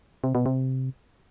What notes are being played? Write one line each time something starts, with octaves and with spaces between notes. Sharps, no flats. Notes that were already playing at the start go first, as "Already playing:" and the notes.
C3
B2
C3